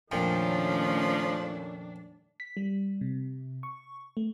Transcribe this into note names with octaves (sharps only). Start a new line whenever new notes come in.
F2 A#2 D#3 F3 A3 C#4 D4
B6
G3
C3
C#6
A3